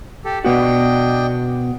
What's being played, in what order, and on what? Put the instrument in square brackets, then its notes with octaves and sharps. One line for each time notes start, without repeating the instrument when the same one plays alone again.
[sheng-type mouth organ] G4 A4
[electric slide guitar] B2 B3 F#4 [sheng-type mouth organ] D4 D#5 G5